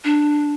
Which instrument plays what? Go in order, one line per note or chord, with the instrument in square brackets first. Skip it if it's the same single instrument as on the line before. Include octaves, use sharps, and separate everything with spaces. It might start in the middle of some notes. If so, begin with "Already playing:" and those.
[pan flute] D4